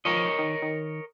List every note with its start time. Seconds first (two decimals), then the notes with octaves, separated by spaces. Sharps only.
0.05 F3 A#4 C#5 D#5
0.39 D#3
0.62 D#3